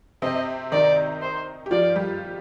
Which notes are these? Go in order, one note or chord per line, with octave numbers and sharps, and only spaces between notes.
C3 C4 D#5
D#3 D#4 D5
C5
G4
F3 F4 D5
G3 G4